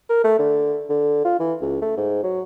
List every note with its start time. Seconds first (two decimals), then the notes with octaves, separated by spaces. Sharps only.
0.10 A#4
0.24 A3
0.39 D3
0.90 D3
1.25 F4
1.39 E3
1.61 C#2
1.82 A3
1.97 G#2
2.23 F#3